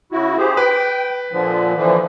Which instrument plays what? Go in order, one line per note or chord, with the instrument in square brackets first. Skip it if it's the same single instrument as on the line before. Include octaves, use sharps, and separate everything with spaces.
[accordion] C#3 E4 F#4
G4 G#4 C5
[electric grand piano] B4 [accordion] G5
[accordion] A#2 D3 F3
D3 E3 F3